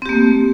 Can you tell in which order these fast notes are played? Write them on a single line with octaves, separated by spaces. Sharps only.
C4 G4 A#3 A3